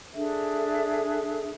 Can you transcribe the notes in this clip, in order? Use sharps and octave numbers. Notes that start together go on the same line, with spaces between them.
D4 G#4 A4 E5